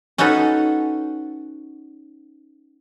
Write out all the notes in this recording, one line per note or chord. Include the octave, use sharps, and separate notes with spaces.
C#4 D#4 F#4 A4 B4 D#5